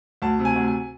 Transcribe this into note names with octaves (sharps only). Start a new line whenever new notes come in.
D2 A5
C3
G#5
D2
G#5